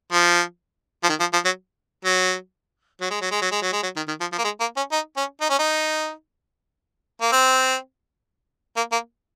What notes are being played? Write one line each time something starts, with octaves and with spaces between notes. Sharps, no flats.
F3
F3
D#3
F3
F3
F#3
F#3
F#3
G#3
F#3
G#3
F#3
G#3
F#3
G#3
F#3
D#3
D#3
F3
F3
A#3
G#3
A#3
C#4
D#4
C#4
D#4
C#4
D#4
A#3
C4
A#3
A#3